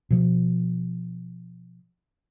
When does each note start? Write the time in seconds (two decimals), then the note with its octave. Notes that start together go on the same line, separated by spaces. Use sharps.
0.10 B2 F3